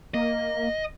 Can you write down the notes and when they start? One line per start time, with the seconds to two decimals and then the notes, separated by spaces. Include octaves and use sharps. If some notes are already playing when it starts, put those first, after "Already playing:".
0.14 A#3 D#5